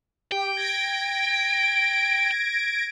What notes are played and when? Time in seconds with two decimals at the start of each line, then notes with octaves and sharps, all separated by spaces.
0.32 G4 G5
0.57 G#6 A#6 D7